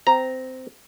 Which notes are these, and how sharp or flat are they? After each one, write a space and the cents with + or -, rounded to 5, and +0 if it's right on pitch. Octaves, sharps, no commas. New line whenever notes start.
C4 -15 A#5 +0